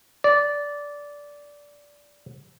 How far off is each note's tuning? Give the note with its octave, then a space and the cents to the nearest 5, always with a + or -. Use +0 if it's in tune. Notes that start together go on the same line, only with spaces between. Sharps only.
D5 -15